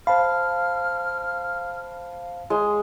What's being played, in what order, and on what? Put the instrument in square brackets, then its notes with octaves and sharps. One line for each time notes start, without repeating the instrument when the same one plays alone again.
[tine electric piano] C5 A5 B5 [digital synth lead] F5 [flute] F6
[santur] G#3